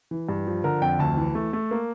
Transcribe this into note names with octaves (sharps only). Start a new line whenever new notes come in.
E3
G2
F3
D3 A#4
F2 G5
D2 A5
E3
A3
A3
A#3